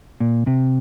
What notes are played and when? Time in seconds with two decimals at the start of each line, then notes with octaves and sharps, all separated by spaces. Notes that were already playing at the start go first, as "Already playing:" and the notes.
0.20 A#2
0.47 C3